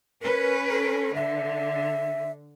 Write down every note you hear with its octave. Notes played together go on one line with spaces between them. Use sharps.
C#4 A#4 B4
A4
D3 E5